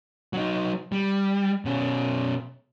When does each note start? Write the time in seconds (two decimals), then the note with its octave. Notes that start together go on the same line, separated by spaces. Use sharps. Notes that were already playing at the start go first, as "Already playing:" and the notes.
0.33 F#3 D#4
0.92 G3
1.65 B2 C#4